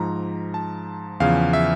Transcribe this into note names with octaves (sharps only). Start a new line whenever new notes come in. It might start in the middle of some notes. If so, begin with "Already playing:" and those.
Already playing: G#2 F3 A#5
A5
E2 C#3 F3 F5
E5